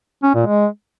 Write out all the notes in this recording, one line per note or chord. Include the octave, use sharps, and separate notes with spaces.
C#4
A#2
G#3